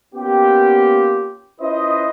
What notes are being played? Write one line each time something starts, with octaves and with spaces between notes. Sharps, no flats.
A#3 B3 C#4 F4 G4
C#4 E4 F4 B4 C5 D#5